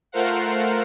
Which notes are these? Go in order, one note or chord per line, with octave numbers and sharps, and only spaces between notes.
A3 F4 A#4 C5 F5 F#5